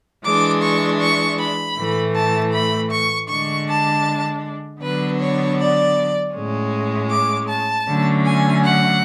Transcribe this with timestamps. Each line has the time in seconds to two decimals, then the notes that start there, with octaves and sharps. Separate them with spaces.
0.23 E3 G#3 D4 D6
0.61 C#6
0.99 C#6
1.38 B5
1.76 A2 E3 A3
2.14 A5
2.52 B5
2.90 C#6
3.28 D3 G#3 D4 C#6
3.67 A5
4.81 D3 F#3 B3 D4 B4
5.19 C#5
5.58 D5
6.34 A2 G#3 C#4
7.10 D6
7.48 A5
7.87 D3 F#3 A3 C#4
8.25 G#5
8.64 F#5